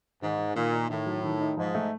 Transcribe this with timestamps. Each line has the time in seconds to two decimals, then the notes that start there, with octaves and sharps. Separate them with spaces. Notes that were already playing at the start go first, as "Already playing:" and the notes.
0.22 G#2 D#3
0.38 D#3
0.55 A#2 D#3
0.73 D#4
0.90 A2 D#3
1.06 F#3
1.24 D#3
1.41 D#4
1.57 G#2 F3
1.75 A3